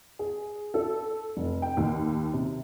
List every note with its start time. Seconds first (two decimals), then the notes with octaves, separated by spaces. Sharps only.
0.19 G#4
0.74 A4
1.37 F1
1.62 G5
1.77 D#2
2.33 C3